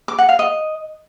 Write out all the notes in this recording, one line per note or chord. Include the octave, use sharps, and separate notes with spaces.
D6
F#5
F5
D#5